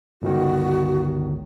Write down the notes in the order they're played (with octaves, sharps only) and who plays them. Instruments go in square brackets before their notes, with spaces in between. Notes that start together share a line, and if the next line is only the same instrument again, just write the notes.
[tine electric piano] G1 C#2 D#3 [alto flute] F#4